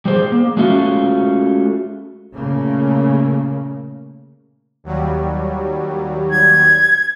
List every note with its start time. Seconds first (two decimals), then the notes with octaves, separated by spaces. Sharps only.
0.05 G3 G#3 C5
0.32 A#3
0.57 G#3 A3 C#4 F4 F#4
2.34 A#2 C#3 A3 A#3
4.84 D#2 F#3 G3
6.30 G#6